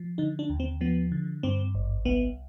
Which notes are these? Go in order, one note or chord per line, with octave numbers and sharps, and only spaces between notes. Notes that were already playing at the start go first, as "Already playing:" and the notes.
Already playing: F3
D3 D#4
D4
D#2
C4
F3 B3
D3
G2 C4
G#1
C2 B3